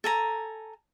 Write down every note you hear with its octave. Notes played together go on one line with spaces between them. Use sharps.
A4 G#5 A#5